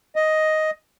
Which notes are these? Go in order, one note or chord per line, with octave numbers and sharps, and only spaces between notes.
D#5